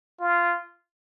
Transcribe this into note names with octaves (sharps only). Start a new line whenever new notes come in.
F4